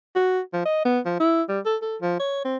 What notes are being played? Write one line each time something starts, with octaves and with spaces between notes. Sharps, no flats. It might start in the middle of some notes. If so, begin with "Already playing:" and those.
F#4
F3
D#5
B3
F3
E4
G3
A4
A4
F3
C#5
C4